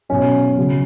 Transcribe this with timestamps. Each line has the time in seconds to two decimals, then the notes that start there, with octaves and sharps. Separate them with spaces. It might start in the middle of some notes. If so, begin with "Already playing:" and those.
0.09 B2 F#3 C#4
0.57 C#3 F#3